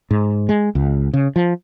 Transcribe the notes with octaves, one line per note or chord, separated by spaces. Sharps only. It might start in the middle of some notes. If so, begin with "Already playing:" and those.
G#2
G#3
C#2
C#3
F3